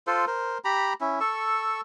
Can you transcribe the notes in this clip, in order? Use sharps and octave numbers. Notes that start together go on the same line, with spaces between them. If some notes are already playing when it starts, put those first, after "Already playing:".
F4 A4 C5
A#4 C5
G4 A#5 B5
C#4 E4
A4 C#6 E6